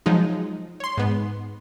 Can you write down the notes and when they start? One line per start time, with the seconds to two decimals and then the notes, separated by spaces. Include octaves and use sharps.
0.06 F3 F#3 G#3 D#4
0.80 C#5 C6
0.97 G#2 B3